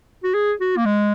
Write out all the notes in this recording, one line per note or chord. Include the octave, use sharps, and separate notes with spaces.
F#4
G#4
F#4
A#3
G#3